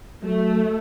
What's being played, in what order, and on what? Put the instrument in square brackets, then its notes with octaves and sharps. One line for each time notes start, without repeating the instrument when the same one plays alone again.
[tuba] F#3 [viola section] A3